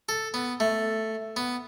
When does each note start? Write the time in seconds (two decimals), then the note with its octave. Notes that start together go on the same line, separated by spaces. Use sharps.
0.09 A4
0.34 B3
0.60 A3
1.37 B3